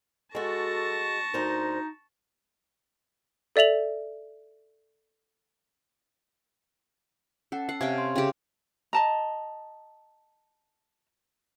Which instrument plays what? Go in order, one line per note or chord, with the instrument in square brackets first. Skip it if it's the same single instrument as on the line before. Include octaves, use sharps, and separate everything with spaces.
[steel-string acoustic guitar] G#3 F#4 [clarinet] A4 [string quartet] A5 C#6 A#6
[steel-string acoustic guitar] D2 A#4 C5 [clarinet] D#4
[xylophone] A4 D5 E5 F7 F#7
[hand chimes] C#4 F#5 [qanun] A4
[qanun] F#5 [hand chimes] C7
[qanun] C3 C#4 G5 [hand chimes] F5 G#5 G#6
[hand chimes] C6
[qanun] C#3 G4 [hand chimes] E5 F5 G5
[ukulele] D#5 A5 A#5